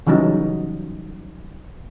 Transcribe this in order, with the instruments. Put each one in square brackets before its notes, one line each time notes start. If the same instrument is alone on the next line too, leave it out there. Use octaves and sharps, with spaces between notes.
[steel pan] C#3 E3 F#3 G3 D#4